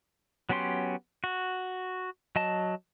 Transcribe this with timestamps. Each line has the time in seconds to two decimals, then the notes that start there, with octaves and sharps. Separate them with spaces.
0.49 F#3 B3 C#4 G4 C6
1.24 F#4
2.36 F#3 D#5 A5